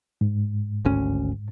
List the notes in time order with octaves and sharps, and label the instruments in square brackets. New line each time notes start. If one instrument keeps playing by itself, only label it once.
[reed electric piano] G#2
[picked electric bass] G#1 D2 C#4